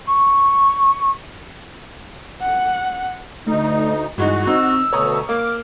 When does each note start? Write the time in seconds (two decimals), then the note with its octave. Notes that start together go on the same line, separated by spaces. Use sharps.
0.07 C#6
2.42 F#5
3.47 D2 A3 D#4
4.18 G2 E3 G#3 D#4 F#4
4.47 C4 D#4 E6
4.93 D2 B2 A3 B4 C#5 A#5 D#6
5.29 A#3 D6 F6